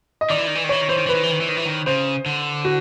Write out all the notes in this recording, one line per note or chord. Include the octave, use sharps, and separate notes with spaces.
D#5
D#3 D5
E3
D#3
E3
D#3
E3 C#5
D#3
E3 C5
D#3
E3 B4
D#3
E3
D#3
E3
D#3
E3
D#3
C#3 C5
D3
F#4